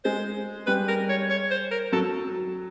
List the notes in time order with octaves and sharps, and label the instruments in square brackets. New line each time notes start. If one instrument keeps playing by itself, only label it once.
[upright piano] G#3 [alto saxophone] C5
[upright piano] G3 [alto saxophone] B4
[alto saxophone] A#4
C#5
C#5
C5
A#4
[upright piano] F#3 [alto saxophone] A4